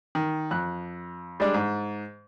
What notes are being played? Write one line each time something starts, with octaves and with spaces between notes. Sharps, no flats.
D#3
F2 F#6
G3 G#3 D4
G#2